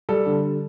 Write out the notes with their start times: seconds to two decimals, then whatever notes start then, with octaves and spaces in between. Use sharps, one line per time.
0.09 G3 A4
0.26 D3